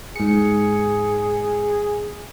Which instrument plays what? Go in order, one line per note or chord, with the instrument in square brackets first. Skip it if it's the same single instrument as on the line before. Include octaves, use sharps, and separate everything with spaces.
[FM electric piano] G#2 C#7 [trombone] G#4